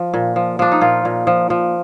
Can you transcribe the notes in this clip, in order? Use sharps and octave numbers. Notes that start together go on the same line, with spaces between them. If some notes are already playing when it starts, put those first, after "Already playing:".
Already playing: F3
A#2
F3
F3 D4
D#4
A#2 F4
A#2
F3
F3